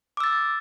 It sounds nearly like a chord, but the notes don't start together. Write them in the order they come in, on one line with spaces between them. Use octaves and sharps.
D6 E6 A6